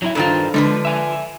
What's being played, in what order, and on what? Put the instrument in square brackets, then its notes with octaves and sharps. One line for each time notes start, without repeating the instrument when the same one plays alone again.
[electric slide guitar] F#3 E4 E5
[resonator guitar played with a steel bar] G2 D#3 F4 [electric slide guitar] A4 C5
[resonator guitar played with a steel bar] D3 F3 B4 [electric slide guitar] G#3
[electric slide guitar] E5 G#5